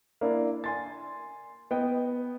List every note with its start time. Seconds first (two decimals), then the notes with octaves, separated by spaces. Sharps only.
0.21 A#3 D4 E4
0.64 G#5 C6 A6
1.71 B3 D#5 G5